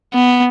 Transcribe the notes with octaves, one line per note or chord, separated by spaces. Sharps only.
B3